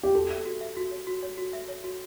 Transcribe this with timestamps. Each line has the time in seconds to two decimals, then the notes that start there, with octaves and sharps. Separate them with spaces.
0.03 G4
0.15 F#4 A4
0.30 E5
0.45 F#4
0.61 E5
0.77 F#4
0.91 C#5
1.07 F#4
1.23 C#5
1.38 F#4
1.53 E5
1.68 C#5
1.84 F#4